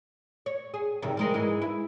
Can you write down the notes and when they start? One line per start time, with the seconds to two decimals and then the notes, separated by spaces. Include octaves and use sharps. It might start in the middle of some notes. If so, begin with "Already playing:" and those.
0.46 C#5
0.74 G#4
1.02 G2 C3 D#3
1.17 F3 G#3 A#4
1.34 G#2 E3 G#3
1.62 E4